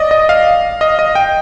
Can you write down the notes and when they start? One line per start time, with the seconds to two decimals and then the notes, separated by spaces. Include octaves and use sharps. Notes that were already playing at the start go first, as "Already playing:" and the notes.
Already playing: D5 D#5
0.11 D#5
0.29 F5
0.81 D#5
0.99 D#5
1.15 G5